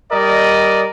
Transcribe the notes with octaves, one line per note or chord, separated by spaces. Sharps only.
G3 A#4 D5 D#5